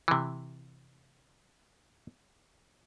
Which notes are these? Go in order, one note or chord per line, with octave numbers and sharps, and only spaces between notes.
C3 E3